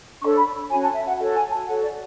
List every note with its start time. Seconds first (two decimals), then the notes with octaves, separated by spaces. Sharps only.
0.21 D4 A4 C#5 C#6
0.37 B5
0.70 C#4 F#4 C#5 G#5
0.81 A5
0.93 E5
1.06 F#5
1.17 F#4 A4 C#5 F#5
1.33 G#5
1.50 A5
1.66 F#4 A4 C#5 F#5
1.82 D5